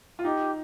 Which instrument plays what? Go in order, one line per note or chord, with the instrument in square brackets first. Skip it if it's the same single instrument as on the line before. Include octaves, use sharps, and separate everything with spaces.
[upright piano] F4
[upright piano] D#4 [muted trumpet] G4